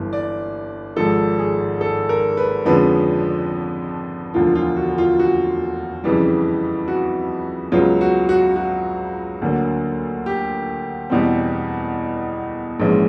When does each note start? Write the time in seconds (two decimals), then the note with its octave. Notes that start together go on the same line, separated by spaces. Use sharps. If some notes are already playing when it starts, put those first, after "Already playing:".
Already playing: G1 G2 E3
0.13 D5
0.96 G#1 G#2 F3 A4
1.39 G#4
1.81 A4
2.09 A#4
2.37 B4
2.65 F2 D3 F3 G#3 C#4 B4
4.34 E1 D2 D3 F3 F4
4.55 F4
4.77 F#4
4.98 F4
5.19 F#4
6.04 F2 C#3 E3 G3
6.88 F#4
7.72 C#2 C#3 F#3 B3 F4
8.01 F#4
8.29 F#4
8.56 F#4
9.42 D2 D3 F#3 A#3
10.26 G4
11.10 E2 B2 G3 C4
12.79 A#1 G#2 E3 G#3 C#4